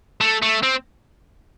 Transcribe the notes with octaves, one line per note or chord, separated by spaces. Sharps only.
A3
A3
C4